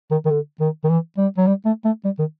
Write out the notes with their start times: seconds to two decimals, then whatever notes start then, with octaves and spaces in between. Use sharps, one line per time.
0.11 D#3
0.25 D#3
0.31 D3
0.60 D#3
0.84 D#3
0.89 E3
1.18 G3
1.38 F#3
1.47 G3
1.65 A3
1.85 A3
2.05 G3
2.19 D#3